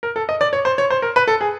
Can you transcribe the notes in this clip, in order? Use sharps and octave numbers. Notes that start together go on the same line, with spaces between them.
A#4
A4
D#5
D5
C#5
C5
C#5
C5
A#4
B4
A4
G#4